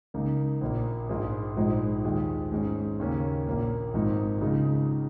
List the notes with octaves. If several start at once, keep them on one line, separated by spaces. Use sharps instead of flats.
C#2 C#3 A#3 D#4
A#1 A#2 A#3
A#1 G#2 G#3 F4
A#1 G#2 F3 G#3 D#4
D#2 D#3 G#3
G#2 G#3 C#4
D#2 C#3 A#3 C#4
A#1 A#2 A#3
G#1 G#2 F3 A#3 D#4
C#2 C#3 G#3 D#4